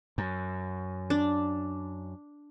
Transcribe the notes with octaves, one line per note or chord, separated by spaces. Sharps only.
F#2
D4